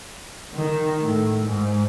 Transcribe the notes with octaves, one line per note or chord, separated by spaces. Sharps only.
D#3
A2
G#2